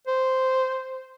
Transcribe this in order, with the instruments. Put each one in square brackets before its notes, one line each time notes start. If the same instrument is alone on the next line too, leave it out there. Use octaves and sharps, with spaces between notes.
[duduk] C5